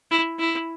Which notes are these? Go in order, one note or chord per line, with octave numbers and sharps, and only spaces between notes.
E4
E4